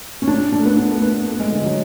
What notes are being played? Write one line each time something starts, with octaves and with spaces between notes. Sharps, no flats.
C#4
D4
D4
A3
B3
D4
A3
B3
A3
G#3
D3
F#3